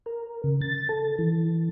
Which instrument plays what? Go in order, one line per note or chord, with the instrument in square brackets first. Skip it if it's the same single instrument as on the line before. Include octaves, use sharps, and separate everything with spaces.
[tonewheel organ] A#4
C#3
A6
A4
E3